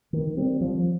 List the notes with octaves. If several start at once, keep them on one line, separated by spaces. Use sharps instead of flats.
D#3
G3 C4
F3